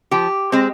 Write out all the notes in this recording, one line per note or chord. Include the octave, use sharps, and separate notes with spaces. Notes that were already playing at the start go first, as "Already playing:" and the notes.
F3 G4
G#3 C4